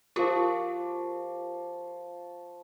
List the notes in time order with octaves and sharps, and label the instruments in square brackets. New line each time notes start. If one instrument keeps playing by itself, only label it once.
[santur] F3 C#6 D6 [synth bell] F4 G4 A#4